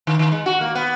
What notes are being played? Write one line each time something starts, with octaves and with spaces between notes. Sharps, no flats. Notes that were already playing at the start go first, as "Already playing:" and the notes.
D#3
D#3
G#3
F#4
A#3
B3